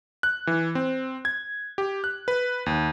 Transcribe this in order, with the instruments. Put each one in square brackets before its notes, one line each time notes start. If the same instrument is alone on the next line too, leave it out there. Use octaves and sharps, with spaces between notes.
[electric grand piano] F#6
E3
C4
G#6
G4
F#6
B4
D#2